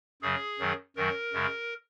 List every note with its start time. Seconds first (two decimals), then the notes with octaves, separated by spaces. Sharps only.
0.22 F#2 C#3 F#3 G#4
0.59 F#2 D#3 F#3
0.96 F#2 D#3 F#3 A#4
1.33 F#2 C#3 G#3